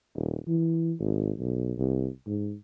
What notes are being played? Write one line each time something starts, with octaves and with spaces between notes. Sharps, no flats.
D#1
E3
G#1
B1
C2
G#2